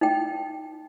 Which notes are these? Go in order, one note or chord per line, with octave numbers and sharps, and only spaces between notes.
D#4 G5